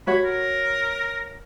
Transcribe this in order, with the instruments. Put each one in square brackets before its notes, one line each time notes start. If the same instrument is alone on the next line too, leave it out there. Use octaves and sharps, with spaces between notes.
[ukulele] F#4 C#5 F#5 [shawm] B5
[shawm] A#4